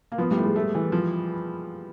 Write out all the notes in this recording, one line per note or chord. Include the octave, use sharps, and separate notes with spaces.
A#3
F3 B3
G3
A2
G#3
A3
E3
F3